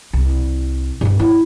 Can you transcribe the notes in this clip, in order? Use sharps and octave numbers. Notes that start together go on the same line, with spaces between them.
C2
G2 B3
E4